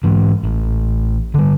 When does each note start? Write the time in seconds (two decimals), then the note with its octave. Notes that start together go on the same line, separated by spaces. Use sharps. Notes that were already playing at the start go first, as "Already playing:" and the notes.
0.04 G#2 E3
0.43 A1
1.34 D3 G3